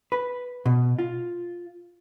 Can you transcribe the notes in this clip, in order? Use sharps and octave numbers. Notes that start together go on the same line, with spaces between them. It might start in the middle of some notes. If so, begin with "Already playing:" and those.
B4
B2
F4